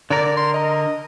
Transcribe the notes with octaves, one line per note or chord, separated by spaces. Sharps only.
D3 A#4 D5
C6
D#5